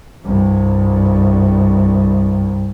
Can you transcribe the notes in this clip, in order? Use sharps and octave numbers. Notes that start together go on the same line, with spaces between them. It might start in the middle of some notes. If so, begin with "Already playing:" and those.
C2 G2